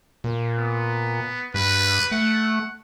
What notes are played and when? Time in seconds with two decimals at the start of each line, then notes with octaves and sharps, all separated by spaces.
0.24 A#2
0.58 B3
1.54 G2 B4
2.12 A3 F#5